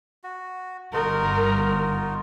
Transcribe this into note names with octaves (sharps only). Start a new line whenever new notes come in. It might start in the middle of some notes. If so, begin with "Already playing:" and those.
F#4
G1 D#4 F4 F#4 A#4